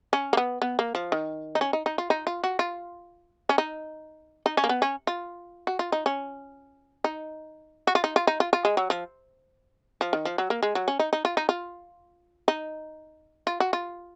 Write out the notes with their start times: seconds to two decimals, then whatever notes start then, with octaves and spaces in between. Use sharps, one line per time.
0.13 C#4
0.33 A#3
0.37 B3
0.62 B3
0.79 A#3
0.95 F3
1.12 D#3
1.55 D#4
1.61 C#4
1.73 D#4
1.86 D#4
1.98 F4
2.10 D#4
2.27 F4
2.44 F#4
2.59 F4
3.49 C#4
3.58 D#4
4.46 D#4
4.57 C#4
4.64 A#3
4.69 B3
4.82 C#4
5.07 F4
5.67 F#4
5.79 F4
5.92 D#4
6.06 C#4
7.04 D#4
7.87 F#4
7.95 F4
8.04 D#4
8.16 F4
8.27 D#4
8.40 F4
8.53 F4
8.65 G#3
8.77 F#3
8.90 F3
10.01 F3
10.13 D#3
10.25 F3
10.38 F#3
10.50 A#3
10.63 G#3
10.75 F#3
10.88 C#4
10.99 D#4
11.13 D#4
11.25 F4
11.37 D#4
11.49 F4
12.48 D#4
13.47 F4
13.60 F#4
13.73 F4